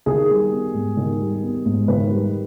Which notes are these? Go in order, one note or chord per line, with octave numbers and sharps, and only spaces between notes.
D#3 G#4
G3
B3
G#2
D#3
G3
B3
G#2
D#3 B4
G3